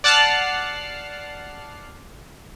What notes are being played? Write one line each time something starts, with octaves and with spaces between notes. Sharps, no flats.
D5 F#5 A5 F6 F#6 C7